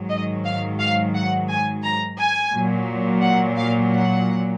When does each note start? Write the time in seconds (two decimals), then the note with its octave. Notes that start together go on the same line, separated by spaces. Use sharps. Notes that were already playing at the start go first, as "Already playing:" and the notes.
Already playing: G#2 D#3 F#3
0.10 D#5
0.46 F5
0.79 F5
1.14 F#5
1.49 G#5
1.84 A#5
2.18 G#5
2.53 A#2 F#3
3.22 F#5
3.57 F5
3.92 F#5